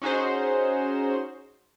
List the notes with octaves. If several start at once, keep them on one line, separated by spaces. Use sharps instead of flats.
C#4 D#4 F#4 G#4 C5